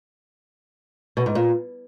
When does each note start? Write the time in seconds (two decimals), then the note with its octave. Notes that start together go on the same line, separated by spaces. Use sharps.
1.17 B2
1.26 G#2
1.35 A#2